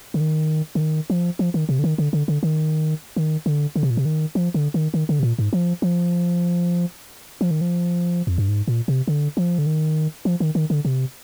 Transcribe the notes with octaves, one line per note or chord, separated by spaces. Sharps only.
D3
D#3
D3
D#3
F3
F3
D#3
C3
D3
D#3
D3
D3
D3
D#3
D#3
D3
D3
C3
A#2
C3
D#3
F3
D3
D#3
D#3
D3
C3
A#2
G#2
F3
F3
F3
D#3
F3
F2
G2
G#2
A#2
C3
D3
F3
D3
D#3
F3
D#3
D#3
D3
C3